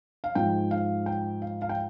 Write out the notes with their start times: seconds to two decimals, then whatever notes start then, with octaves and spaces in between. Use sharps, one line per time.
0.24 F5
0.35 G#2 F3 G5
0.71 F5
1.06 G5
1.42 F5
1.62 F5
1.69 G5